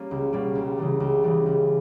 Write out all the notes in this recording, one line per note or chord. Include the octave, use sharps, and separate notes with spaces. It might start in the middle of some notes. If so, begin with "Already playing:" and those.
Already playing: G3 A#3 C#4
C#2
B2 G3 A#3 C#4
C#2
C#3 E3 G3
C#2
C#3 E3 G3
C#2